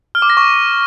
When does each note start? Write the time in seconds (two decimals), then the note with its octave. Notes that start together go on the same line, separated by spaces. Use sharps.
0.15 F6
0.22 D6
0.30 A#6
0.37 C#6